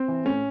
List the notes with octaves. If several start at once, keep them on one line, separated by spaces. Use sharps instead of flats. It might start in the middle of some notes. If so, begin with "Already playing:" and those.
Already playing: C4
E3
A2 C#4